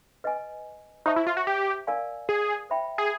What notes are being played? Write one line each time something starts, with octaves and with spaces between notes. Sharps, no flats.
B4 D#5 G#5
D#4 C5 E5 A5 C#6
E4
F4
F#4
G4
A#4 D5 F5 G#5
G#4
C5 E5 G5 B5
G#4